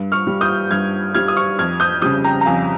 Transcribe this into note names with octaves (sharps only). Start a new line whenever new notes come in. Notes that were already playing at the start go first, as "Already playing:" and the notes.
Already playing: G2
C#6 F6
G3
D#6 G6
G2 F6 G#6
G3 F6 G#6
D#6
C#6 F6
F2 F6 G#6
D#6 G6
C#3 G3 D#6 G6
G5 A#5
A#5
F2 F5 G#5